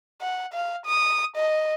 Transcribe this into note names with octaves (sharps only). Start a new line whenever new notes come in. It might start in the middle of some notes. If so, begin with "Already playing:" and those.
F#5
F5
D#6
D#5